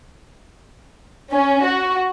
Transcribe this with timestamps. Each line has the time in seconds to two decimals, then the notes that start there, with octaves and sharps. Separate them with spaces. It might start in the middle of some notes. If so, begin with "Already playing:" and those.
1.30 C#4
1.65 F#4